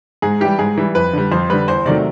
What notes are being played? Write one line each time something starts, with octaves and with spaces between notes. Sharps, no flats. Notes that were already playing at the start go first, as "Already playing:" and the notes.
G#2 G#4
E3 G3 G4
G#2 G#4
E3 G3
F2 B4
D3 G3
F2 C5
D3 G3 B4
E2 C5
C3 D#3 F#3 A3 D5